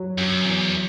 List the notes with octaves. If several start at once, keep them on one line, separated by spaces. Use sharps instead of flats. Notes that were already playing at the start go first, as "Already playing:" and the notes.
Already playing: F#3
F#2
E2